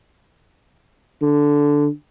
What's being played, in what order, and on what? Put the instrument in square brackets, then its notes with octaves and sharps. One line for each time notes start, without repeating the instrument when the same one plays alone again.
[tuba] D3